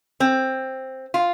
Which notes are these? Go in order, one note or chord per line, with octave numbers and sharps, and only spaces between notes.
C4
F4